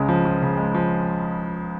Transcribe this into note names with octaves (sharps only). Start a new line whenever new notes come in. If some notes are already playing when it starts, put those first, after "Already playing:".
Already playing: C#2 C#3 G#3
F3
F3
C#3
G#3
F3